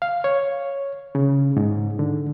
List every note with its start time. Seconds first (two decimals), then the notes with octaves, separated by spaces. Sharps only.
0.02 F5
0.24 C#5
1.15 C#3
1.57 G#2
1.99 D3